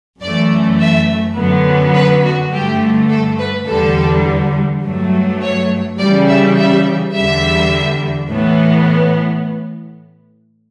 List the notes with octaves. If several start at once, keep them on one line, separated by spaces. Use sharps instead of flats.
F#2 E3 A3 D5
E5
F#2 D3 F#3 B3
B4
F#4
G2 D3 A3 G4
A4
B4
E2 D3 G3 A4
G2 F#3 A3
C#5
C#3 E3 G3 D5
E5
E5
E2 D3 G3 E5
A2 E3 B3